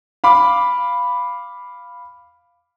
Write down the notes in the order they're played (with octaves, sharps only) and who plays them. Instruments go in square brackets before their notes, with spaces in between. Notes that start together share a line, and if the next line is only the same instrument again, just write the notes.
[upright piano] F5 B5 D6